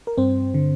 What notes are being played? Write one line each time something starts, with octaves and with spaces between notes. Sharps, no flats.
A#4
G2 C4 C5
D3